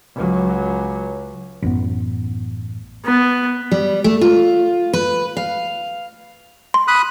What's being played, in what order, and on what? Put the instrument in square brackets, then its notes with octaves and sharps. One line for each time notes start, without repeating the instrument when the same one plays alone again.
[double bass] C#2 F#3
[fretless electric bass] A1 F#2 B3
[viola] B3
[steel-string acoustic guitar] G3
A3
F4
B4
F5
[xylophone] C6
[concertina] B5 D#6 F#6